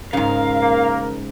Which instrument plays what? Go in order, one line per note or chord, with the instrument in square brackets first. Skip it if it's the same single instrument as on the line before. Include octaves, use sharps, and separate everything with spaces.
[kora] G#2 C#3 [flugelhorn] A#4 [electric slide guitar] F5
[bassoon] A#3